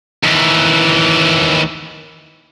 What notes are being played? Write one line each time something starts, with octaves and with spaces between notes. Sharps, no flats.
D#2 E3